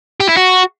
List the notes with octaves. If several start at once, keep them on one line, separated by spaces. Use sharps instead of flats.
G4
E4
F#4